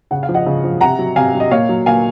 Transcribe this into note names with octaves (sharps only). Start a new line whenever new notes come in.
C#3 F#5
F5
F3
D#5 F#5
C#3
F3
C3 F#5 A#5
F#3
C3 F5 G#5
F#3
D#5
A#2 C#5 F5
F#3
A#2 F5 G#5